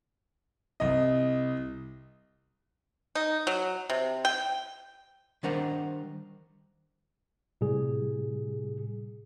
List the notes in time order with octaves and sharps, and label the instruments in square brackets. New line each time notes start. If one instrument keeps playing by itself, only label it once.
[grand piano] C2 D#5
[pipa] D#4
F#3
C3
G5
[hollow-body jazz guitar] D#3 G3 D4 A#4 C5 F#5
[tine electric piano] A2 C3 G3 G#4